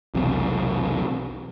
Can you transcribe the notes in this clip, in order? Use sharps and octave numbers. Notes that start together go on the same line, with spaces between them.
B1 E2 C3